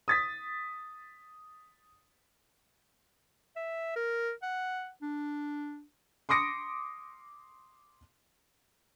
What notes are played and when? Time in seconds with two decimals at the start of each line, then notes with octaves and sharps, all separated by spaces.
0.08 D#6 A6 B6
3.56 E5
3.96 A#4
4.42 F#5
5.02 D4
6.29 C6 D6 D#6 A#6 C#7 D7